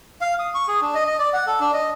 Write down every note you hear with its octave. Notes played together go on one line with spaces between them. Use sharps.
F5
D#6
C#6
G#4
D4
D#5
D#5
D5
F#5
A4
D4
D#5